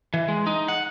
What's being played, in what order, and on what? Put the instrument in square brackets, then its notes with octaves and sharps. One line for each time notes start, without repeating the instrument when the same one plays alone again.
[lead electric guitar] E3
G#3
D#4
F#5